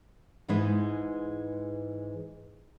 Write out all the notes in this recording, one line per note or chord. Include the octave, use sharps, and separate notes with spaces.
G#2 E3 G#3 D#4 B4